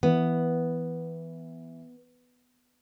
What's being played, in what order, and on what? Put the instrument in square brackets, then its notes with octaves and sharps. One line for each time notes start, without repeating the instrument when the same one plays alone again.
[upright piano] E3 [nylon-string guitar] B3